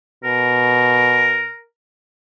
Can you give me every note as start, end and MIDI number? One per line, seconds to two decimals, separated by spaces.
0.24 1.50 47
0.24 1.64 70